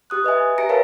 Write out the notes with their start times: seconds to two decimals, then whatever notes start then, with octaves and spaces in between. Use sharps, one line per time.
0.10 G4 D#6 F#6
0.24 B4 D#5 E5 G#5
0.58 G4 E5 A#5 A#6 C#7 D7
0.69 A#4 B4 C#5 F5 A5